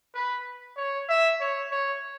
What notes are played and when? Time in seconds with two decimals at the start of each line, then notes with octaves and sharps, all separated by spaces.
0.15 B4
0.77 C#5
1.09 E5
1.41 C#5
1.71 C#5